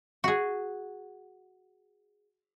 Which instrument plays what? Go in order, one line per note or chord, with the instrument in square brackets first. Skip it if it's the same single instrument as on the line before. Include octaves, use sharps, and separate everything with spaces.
[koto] F#4 G#4